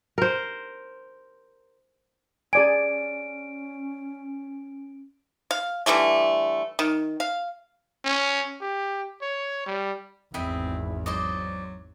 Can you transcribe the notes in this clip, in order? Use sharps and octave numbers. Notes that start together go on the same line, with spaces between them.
A#4 C5
C#4 G#4 D5 G#5 D7
F5
D3 E3 G3 A3
D#3
F5
C#4
G4
C#5
G3
G#1 E2 C4 E4 D#5 B5
F#3 C5 D5 D#5